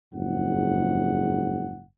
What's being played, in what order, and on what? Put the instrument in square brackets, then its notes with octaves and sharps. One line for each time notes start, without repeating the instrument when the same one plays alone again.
[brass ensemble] F#1 F2 G#2 F#5